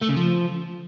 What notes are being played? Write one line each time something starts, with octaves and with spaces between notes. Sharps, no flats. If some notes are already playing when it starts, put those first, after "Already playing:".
A3
C#3
F3